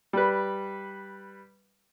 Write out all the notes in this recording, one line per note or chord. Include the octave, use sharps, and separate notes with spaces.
G3 B4